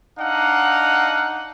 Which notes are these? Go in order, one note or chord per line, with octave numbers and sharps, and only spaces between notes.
D4 D#4 F5 F#5